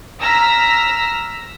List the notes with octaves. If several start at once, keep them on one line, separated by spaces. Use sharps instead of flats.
A#5 E6 F6 A#6 B6